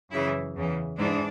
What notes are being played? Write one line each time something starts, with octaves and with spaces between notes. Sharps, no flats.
F#2 C#3 E3 E4
E2 C#3 E3
G#2 E3 D4